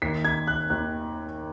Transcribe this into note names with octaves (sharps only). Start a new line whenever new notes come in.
D#2 D#3 B6
G#6
F#6
D#2 D#3 F#6